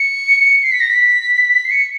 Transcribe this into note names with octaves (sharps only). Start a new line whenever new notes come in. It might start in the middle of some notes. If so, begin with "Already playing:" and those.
Already playing: C#7
C7
B6
A#6
B6
C7
C#7